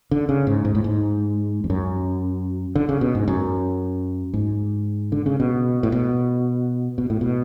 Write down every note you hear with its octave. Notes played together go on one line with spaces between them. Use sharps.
D3
C#3
G#2
G#2
A2
G#2
F2
F#2
D3
C#3
B2
G#2
F#2
G#2
D3
C#3
B2
A2
B2
B2
A2
B2